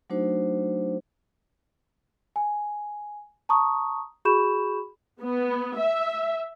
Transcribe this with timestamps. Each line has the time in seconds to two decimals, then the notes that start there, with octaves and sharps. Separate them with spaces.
0.10 F#3 A3 D4 D#4 F#4 C5
2.36 G#5
3.49 A5 A#5 C#6 D#6
4.25 F#4 G#4 B5 C#6 G6 E7
5.21 B3
5.78 E5